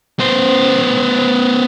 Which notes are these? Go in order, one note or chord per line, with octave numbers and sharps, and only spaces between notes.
B3 C5